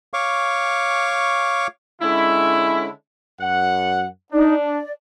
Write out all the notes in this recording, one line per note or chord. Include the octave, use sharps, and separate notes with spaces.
C#5 F5 C#6 D6
D3 G#3 C#4 E4
F#2 F#5
D4 D#4 D5
D5